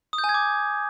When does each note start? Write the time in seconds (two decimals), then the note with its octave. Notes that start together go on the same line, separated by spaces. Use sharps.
0.13 D#6
0.18 G6
0.24 G#5
0.29 G#6
0.34 D6